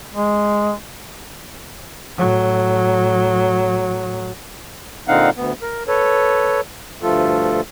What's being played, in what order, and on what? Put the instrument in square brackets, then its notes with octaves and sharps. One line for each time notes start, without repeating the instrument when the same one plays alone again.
[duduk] G#3
[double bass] A2 F#3
[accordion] A#2 D3 C4 D#4 F5 F#5
D2 B3
A#4
A4 B4 C#5
D2 G2 F3 A3 F4 A4